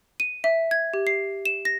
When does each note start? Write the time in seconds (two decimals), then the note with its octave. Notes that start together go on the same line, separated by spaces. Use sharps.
0.20 D#7
0.44 E5
0.71 G#6
0.94 G4
1.07 C7
1.46 E7
1.65 A#6